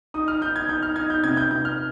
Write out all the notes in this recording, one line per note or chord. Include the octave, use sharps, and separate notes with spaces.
D#4 D#6
F6
D#4 G6
G#6
D#4 G6
F6
D#4 G#6
G6
C3 G#6
G6
C3 G6
F6